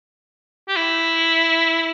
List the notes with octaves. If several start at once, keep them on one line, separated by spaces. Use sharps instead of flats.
G4
E4